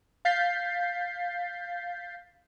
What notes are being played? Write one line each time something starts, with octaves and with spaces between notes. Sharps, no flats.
F5 G6 A6 B6 C7